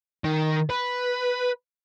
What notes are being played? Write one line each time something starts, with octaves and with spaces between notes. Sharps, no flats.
D#3
B4